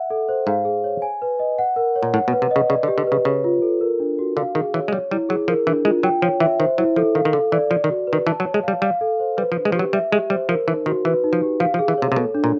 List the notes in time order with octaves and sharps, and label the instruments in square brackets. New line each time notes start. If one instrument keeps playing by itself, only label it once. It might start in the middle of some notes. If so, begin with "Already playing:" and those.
Already playing: [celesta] E5 F#5
A4
C5
[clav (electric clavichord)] G#2 [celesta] F5
[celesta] G#4
C#5
G#5
B4
D#5
F#5
A#4
C#5
[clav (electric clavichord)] A#2
[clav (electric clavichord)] A2 [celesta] F#5
[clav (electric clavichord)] B2
[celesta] B4
[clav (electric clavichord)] C3
[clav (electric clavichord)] C#3 [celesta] D#5
[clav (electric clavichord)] C#3 [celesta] D5
[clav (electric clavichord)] D3
[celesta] G4
[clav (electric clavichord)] D3
[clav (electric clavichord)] C#3 [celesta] B4
[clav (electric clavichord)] C#3 [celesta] C#5
[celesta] F4
A4
A#4
D4
F#4
[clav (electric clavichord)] D3 [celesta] F5
[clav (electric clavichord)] D#3 [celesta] G#4
[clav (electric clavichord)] E3 [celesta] C#5
[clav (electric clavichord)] G#3
[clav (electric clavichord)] G3 [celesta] C#5
[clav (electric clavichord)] G3 [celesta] E4
[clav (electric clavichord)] F#3 [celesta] G#4
[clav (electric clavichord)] F3 [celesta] A#4
[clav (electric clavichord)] E3 [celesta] D4
[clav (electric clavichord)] G#3 [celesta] F4
[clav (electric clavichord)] F#3 [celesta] G5
[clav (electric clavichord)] F3 [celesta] C#5
[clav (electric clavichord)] E3 [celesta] E5
[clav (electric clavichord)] D#3 [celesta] C5
[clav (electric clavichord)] F#3 [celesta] E4
[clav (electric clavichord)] F3 [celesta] A4
[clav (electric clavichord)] D#3 [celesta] F5
[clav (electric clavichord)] D#3
[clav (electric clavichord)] D3 [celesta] A4
[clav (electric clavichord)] E3 [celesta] D5
[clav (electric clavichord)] F3 [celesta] D5
[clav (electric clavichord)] D#3
[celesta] F#4
B4
[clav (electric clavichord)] D#3
[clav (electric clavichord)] E3 [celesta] A5
[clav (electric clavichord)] F#3
[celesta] C#5
[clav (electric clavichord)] G#3
[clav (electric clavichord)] G3 [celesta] F5
[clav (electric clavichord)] G3 [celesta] F5
[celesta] A4
C5
[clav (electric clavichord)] G3 [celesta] B4
[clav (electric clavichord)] F3
[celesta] D4
[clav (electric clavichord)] G#3
F3
[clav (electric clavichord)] F#3 [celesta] G4
[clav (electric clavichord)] G3 [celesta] E5
[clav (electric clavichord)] G#3 [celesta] G4
[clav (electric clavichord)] G3 [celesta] C5
[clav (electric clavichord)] F3 [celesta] A#4
[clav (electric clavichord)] E3 [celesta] D#4
[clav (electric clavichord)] D#3 [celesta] F#4
[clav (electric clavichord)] E3 [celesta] B4
[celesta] D#4
[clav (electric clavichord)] F3
[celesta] G4
[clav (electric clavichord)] F3 [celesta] F5
[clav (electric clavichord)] F3
[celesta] G#4
[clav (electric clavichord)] E3
[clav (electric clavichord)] C3 [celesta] C#5
[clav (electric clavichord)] C3
[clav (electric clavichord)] B2 [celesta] A4
[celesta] D4
[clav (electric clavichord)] A#2